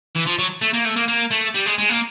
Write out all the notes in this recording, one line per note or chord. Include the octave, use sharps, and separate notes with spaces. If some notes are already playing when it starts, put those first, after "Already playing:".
E3
F3
F#3
A3
A#3
A3
A#3
A#3
A3
G3
G#3
G#3
A#3